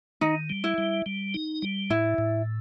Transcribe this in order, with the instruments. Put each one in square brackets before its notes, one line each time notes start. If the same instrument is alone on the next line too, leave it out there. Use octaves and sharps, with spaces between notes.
[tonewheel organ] D#3 [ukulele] D#4
[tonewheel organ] G3
[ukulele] E4
[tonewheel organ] G3
G3
D#4
G3
[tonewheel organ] A2 [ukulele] E4
[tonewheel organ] A2